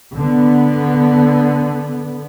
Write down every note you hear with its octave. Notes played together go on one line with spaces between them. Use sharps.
D3 B3